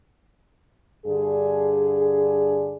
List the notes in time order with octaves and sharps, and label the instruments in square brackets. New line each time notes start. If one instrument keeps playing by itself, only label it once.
[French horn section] G2 D3 G#4